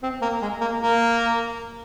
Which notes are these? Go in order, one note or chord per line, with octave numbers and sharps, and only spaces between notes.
C4
A#3
G#3
A#3
A#3